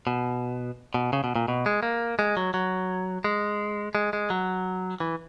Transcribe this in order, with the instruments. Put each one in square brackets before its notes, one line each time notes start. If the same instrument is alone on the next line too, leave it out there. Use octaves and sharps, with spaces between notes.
[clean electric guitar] B2
B2
C#3
B2
A#2
B2
G#3
A#3
G#3
F#3
F#3
G#3
G#3
G#3
F#3
E3